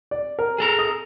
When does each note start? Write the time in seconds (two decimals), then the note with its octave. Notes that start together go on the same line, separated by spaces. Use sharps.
0.11 D5
0.39 A#4
0.58 G#4 A4 A#5
0.79 D#6